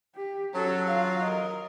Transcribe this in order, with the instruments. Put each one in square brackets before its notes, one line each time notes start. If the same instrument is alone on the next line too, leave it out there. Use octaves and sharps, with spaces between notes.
[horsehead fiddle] G4
[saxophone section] F#3 [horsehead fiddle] C#4 A4
[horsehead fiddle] F4 F5
A#4 D#5